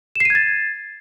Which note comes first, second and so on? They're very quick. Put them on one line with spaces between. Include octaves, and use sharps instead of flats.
E7 C7 D#7 G#6 A6